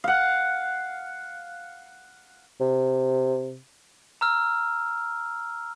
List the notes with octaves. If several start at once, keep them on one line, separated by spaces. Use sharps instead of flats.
F5 F#5
C3
A#5 E6 F6